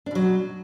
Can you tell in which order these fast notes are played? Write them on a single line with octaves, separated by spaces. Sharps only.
D4 B2 F#3